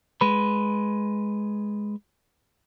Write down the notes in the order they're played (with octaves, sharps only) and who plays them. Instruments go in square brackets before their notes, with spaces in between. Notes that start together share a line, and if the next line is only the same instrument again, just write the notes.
[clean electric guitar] G#3 B4